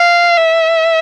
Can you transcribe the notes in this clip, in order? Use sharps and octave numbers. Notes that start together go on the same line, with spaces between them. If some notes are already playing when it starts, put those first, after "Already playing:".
Already playing: F5
E5